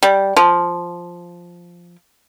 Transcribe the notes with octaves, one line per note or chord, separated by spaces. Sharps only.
G3
F3